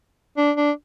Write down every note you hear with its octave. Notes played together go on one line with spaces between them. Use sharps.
D4
D4